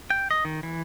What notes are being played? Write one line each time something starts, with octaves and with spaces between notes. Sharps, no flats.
G5
D#5
D#3
E3